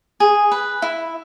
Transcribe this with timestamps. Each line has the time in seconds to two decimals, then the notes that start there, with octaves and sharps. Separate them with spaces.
0.20 G#4
0.52 B4
0.82 E4